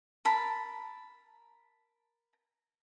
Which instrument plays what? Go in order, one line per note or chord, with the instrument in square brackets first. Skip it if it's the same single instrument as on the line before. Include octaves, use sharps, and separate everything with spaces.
[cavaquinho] A#4 A5 B5